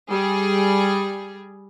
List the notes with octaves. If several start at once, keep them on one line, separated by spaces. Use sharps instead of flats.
G3 G#4